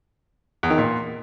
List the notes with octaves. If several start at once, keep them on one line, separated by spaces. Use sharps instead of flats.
E2
D#3
A#2